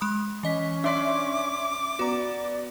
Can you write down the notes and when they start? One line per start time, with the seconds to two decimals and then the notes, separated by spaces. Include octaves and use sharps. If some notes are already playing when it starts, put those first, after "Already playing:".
0.01 G#3 B5 D#6
0.43 E3 C#4 D#5 B6
0.84 D4 D5 E5 C6 D6 B6
1.99 B3 F#4 D5 A#5